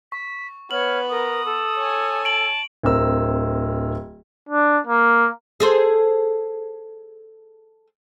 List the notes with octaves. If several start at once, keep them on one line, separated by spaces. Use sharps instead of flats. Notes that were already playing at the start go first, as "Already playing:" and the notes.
C#6 B6
B3 B4 C#5 F6 F#7
A#4 D#6
A4
C#5 G#5
A5 D7 F#7
D1 C4 A#4 E6
D4
A#3
G#4 A4 C5